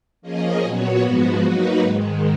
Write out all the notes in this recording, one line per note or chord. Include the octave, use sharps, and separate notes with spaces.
F3 A#3 C#4 G#4 D#5
A#2 F#3 B3 F#4 C#5
G#2 F3 G#3 B3 F#4
F#3 A#3 D#4 F#4 B4
G#2 D#3 G#3